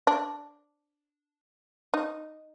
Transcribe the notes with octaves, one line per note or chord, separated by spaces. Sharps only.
D4
D#4